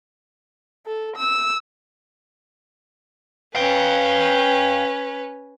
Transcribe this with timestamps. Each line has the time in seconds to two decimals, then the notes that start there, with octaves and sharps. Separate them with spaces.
0.86 A4
1.16 E6
3.55 C#4 B4 F5 G5